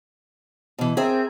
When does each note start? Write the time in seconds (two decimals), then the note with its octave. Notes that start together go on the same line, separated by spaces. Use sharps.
0.78 B2 E3
0.97 C4 G#4 A#4 E5